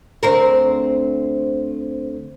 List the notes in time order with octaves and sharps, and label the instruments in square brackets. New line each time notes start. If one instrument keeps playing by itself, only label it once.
[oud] D2 C4 A#4